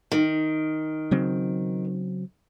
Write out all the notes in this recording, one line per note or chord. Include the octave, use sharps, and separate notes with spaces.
D#3
C#3 F#3 C4